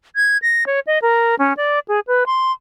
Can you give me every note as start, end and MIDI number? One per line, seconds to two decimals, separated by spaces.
0.16 0.37 92
0.42 0.64 94
0.66 0.80 73
0.87 0.99 75
1.02 1.35 70
1.39 1.53 61
1.57 1.79 74
1.88 2.00 68
2.07 2.24 71
2.26 2.52 84